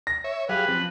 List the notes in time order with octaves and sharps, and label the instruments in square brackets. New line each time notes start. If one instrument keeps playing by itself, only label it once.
[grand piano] A#6
[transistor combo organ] C#5 E5
[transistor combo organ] F#3 G#4 F5 [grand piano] G4 [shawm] B4
[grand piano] F3 [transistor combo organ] C4